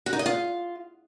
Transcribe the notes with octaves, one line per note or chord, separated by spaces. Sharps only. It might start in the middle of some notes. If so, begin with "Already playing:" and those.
F#4
D#4
D#5
F4